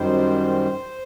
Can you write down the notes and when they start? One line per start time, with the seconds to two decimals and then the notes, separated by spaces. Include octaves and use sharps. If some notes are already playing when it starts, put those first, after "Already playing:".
Already playing: F#2 D#3 G3 C5